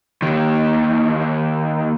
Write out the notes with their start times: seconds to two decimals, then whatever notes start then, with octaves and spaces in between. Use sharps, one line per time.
0.22 D#2 D#3